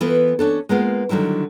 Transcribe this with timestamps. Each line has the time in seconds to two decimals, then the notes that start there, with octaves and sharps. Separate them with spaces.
0.01 E3 B3 F4 A4
0.39 C#4 D4 A4
0.69 G#3 A#3 B3 F4
1.09 D3 D#3 F#3 G3 E4